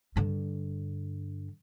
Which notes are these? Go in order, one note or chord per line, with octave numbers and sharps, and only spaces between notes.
G2 D3